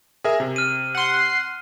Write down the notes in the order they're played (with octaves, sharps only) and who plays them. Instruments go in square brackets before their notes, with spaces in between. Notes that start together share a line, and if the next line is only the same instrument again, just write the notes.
[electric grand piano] G#4 A#4 E5
C3
[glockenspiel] F6 D#7
[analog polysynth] F#5 C6